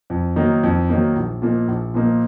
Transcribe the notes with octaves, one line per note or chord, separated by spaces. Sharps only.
F2
D#3 F#3 A#3 D#4
F2
D#3 F#3 A#3 D#4
A#1
A#2 F3 A#3 D#4
A#1
A#2 F3 A#3 D#4